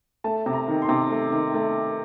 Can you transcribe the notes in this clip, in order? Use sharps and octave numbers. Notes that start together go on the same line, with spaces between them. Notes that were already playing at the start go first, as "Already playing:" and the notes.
A3 A5
C3
A#5
D#3
C6
C3
A3
D#3
A3